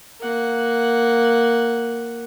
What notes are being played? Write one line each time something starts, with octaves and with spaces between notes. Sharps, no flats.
A#3 F#5